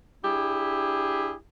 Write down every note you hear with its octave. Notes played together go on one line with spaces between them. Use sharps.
D4 E4 G4 G#4